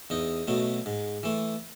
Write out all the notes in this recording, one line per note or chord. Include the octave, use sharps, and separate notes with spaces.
E2 D#4
B2 F#3 A3
G#2
E3 A3